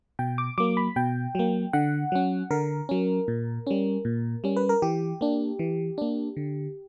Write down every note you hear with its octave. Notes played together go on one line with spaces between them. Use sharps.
B2 G5
D6
F#3 A#3 D6
B5
B2 G5
F#3 A#3
D3 F#5
F#3 C#4
D3 A#4
F#3 C#4
A#2
G3 C#4
A#2
G3 C#4
B4
A#4
E3 G4
A#3 D4
E3
A#3 D4
D3